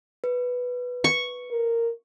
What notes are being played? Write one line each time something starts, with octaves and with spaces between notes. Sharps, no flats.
B4
C#6
A#4